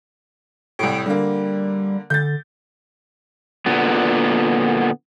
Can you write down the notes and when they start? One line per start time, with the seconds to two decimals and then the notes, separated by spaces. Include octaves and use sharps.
0.79 C2 A2 D7
1.06 D3 G3 A#3
2.10 D3 G6 A6
3.66 A#2 D3 B3